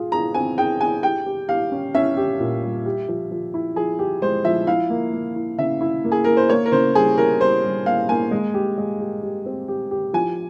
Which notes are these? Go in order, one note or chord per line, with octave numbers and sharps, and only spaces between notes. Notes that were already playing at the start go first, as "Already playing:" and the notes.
Already playing: F4 G#4
G#4 A#5
C4 G#5
G#4 G5
G#4 G#5
G4 G5
G4
G4 F5
C#4
C#4 E5
G4
A#2
G3
G4
F3
F3
E4
F3 G#4
G4
G#3 C5
F3 E5
E4 F5
A#3
A#3
E4
C#3 E5
E4
A#3
G#4
A#3 A#4
C5
A#3 C#5
A#4
C#3 C5
G3 G#4
E4 A#4
G3 C5
G3
A#3 F5
A#3 G#5
G#3
G4
G#3
G4
G4
C4
G4
G4
F3 G#5